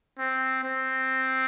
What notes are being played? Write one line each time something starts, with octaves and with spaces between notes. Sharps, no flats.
C4
C4